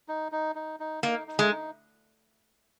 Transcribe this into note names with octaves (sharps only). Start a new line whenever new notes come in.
D#4
D#4
D#4
D#4
A#3 D#4
D#4
G#3
D#4